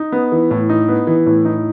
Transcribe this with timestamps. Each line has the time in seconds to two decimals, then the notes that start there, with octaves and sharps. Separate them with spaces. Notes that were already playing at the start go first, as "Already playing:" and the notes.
Already playing: D#4
0.12 B3
0.32 E3
0.51 A2
0.69 D#4
0.89 B3
1.07 E3
1.26 A2
1.45 D#4